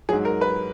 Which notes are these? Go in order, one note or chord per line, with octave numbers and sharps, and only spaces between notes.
G#2 F#3 G#4
A#4
B4